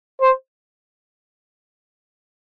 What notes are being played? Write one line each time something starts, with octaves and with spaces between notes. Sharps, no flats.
C5